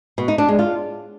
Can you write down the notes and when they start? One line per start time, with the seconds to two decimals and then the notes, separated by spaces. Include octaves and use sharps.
0.18 B2
0.28 D#4
0.38 D4
0.49 G#3
0.59 F4